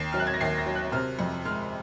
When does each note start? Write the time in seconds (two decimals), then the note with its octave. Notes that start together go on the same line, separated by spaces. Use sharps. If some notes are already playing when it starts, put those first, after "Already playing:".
Already playing: D#2 C7
0.12 F#3 F6
0.19 F#6
0.27 G#6
0.34 A#6
0.40 D#2 C7
0.58 A#6
0.66 F#3
0.75 F#6
0.92 C3 F6
1.19 F2
1.45 G#3 F6